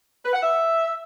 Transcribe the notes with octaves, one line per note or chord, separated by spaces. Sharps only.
B4
F#5
E5